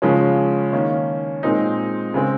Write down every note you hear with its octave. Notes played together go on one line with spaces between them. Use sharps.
C#3 F3 G#3 C#4
D#3 A#3 C#4
A#2 G#3 C4 D#4
C#3 G#3 C4